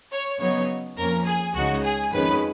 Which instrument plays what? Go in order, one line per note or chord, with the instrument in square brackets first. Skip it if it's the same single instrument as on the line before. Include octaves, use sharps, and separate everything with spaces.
[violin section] C#5
[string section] C#3 F#3 B3 D#4 [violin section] C#5
[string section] F2 F3 A#3 C#4 [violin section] A#4
[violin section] G#4
[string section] C#2 C#3 G#3 D#4 [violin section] F#4
[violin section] G#4
[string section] F2 D#3 G#3 C#4 [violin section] B4